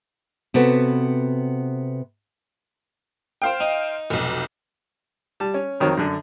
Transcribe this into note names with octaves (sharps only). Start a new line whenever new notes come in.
C3 B3 F#4 A4 B4
C5 F5 G5
D#4
F1 B1
G3 A5
C#4
F2 D#3 F#3 C4 C#5
F#2 D3